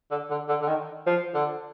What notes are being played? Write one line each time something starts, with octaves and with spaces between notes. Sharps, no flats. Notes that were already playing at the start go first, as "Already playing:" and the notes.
D3
D3
D3
D3
D#3
F3
D3